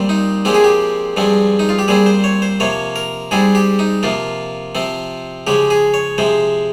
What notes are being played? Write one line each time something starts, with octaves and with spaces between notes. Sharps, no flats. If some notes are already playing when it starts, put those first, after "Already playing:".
Already playing: A#2 G3 C4
D#4
A#2 F3 G#3 C4 G4
G#4
G4
G2 F3 G#3 C4
D#4
F4
G4
A#2 G3 C4 G#4
C5
C#5
C5
C3 F3 A#3 C#5
A#4
G#2 G3 C4 G#4
G4
D#4
C3 F3 A#3 F4
C3 F3 C4
C#3 F3 G#3 G4
G#4
C#5
C3 F3 G#3 C5